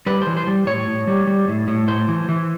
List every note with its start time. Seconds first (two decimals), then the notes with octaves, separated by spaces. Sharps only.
0.06 G3 B4
0.22 C5
0.27 E3
0.37 C5
0.47 G3
0.67 A2 C#5
0.87 A2
1.07 G3
1.27 G3
1.48 A2
1.68 A2
1.88 A2 C5
2.08 E3
2.29 E3